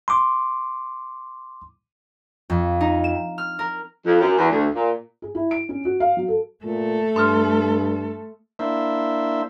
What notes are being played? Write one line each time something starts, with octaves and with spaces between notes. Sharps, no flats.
C6 D6
F2
D#4
E7
F6
A#4
F2
F#2
E2
D2
A#2
G#4
E4
D7
C#4
F#4
F5
F#3
A4
A#2 A3 A4
G2 C6 D#6 F6
A#3 D4 E4 C5 E5